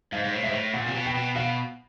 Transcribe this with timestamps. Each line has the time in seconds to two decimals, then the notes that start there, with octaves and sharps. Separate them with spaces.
0.12 G#2 F5
0.24 G#2
0.33 A2
0.43 G#2 E5
0.53 A2
0.74 A#2 F#5
0.86 C3
0.94 B2
1.05 G5
1.15 B2
1.35 B2 F5